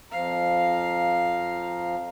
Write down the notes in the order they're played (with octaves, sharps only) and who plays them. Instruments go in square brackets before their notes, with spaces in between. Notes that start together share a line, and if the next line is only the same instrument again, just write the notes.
[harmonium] F2 F3 A#5 [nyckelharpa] F5